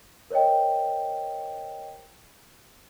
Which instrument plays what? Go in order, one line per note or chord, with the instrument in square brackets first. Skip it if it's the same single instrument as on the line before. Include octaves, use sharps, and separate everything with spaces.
[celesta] A#4 C5 C#5 D#5 G5